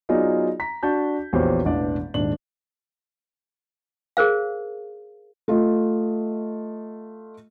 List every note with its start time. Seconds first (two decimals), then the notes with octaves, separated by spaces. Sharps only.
0.09 F#3 B3 D#4 F4 G#4 D5
0.60 A#5 B6
0.83 D4 F#4 A5 G6
1.33 A#1 E2 F#4 G4 C5 C#5
1.65 E1 A1 D4 D5
2.14 D#1 G#2 D4 F#7
4.17 G#4 A#4 C5 F5
5.48 A3 F4 D#5